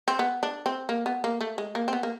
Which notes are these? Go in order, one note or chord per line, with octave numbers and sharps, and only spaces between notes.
C4
B3
D4
C4
A#3
B3
A#3
A3
G#3
A#3
C4
B3
A#3